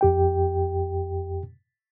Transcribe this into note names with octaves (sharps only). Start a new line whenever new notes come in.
F2 G4 G5